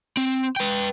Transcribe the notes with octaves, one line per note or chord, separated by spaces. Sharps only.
C4
B4 G5